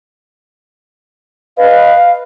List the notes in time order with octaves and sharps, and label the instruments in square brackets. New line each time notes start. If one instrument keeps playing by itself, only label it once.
[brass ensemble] B4 D#5 [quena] F5